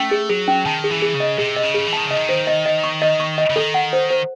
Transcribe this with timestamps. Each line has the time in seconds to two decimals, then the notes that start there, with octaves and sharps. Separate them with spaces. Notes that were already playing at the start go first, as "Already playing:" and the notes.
Already playing: A3 C#4
0.11 G#4
0.30 F#3 G#4
0.48 C#4
0.66 D#3 A5
0.84 G#4
0.90 E3
1.02 G#4
1.14 C#3
1.20 D#5
1.38 C3 G#4
1.56 D#5
1.63 C#3
1.74 G#4
1.87 E3
1.93 D#3 A5
2.06 C#3 D#5
2.16 D#3
2.29 C5
2.47 D#5
2.66 D#5
2.84 C#6
3.02 D#5
3.20 C#6
3.38 D#5
3.50 C#3
3.56 D#3 A4
3.74 F#5
3.93 C5
4.11 C5